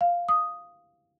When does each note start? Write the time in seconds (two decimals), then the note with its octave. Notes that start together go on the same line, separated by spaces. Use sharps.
0.01 F5
0.29 D#6